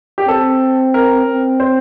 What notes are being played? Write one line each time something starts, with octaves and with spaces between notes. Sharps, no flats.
G4
C4 A4
A#4
C4
C5